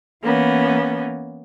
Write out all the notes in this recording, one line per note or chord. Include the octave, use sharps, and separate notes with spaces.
E3 A#3 B3 C#4